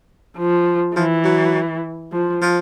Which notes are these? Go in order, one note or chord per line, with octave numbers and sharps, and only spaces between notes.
F3
E3 F3
F#3
F3
F3